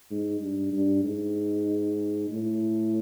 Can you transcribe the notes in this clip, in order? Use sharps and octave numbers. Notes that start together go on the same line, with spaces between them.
G#2
G2
G2
G#2
A2